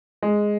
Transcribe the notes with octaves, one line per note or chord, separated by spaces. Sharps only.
G#3